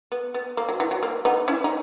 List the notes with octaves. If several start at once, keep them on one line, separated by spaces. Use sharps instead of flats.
B3
B3
A#3
F#3
E3
F#3
A#3
B3 D#4
C#4 E4
D#4